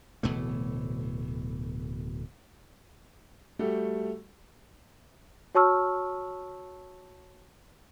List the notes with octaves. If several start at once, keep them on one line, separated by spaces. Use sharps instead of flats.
D1 B2 E3 A3
G3 A3 F#4 G4 A4
F#4 C#5 A5 C#6 E6 F6